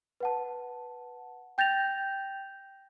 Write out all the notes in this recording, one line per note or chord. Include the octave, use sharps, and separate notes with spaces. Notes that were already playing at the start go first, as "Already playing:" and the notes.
B4 F#5 A5
G5 G6 A6 A#6 F7